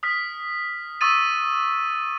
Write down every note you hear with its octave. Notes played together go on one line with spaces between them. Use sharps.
D#6 F6 B6
C#6 D#6 E6 A6 D#7